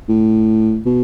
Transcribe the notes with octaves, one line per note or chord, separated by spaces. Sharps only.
A2
B2